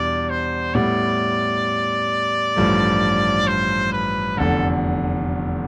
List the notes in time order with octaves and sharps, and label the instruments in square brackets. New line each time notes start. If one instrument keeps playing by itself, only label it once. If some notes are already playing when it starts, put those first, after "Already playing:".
Already playing: [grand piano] E2 B2 G3 D4 [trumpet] D5
[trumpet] C5
[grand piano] A2 G3 B3 [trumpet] D5
[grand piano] A1 G2 F3 A3
[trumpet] C5
B4
[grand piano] F1 E2 D3 [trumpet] A4